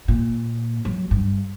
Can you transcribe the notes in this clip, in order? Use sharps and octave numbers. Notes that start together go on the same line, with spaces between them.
A#2
F#3
G2